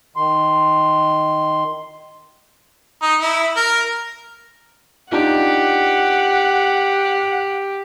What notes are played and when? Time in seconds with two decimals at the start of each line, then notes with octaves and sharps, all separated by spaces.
0.16 D#3 C6
3.02 D#4
3.21 E4
3.57 A#4
5.12 D4 D#4 F4 G4 F#5